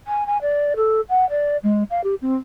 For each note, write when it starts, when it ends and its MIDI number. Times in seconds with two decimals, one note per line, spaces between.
0.07 0.26 80
0.26 0.37 80
0.41 0.73 74
0.76 1.01 69
1.09 1.27 78
1.29 1.57 74
1.63 1.83 56
1.90 2.03 77
2.03 2.14 67
2.21 2.36 60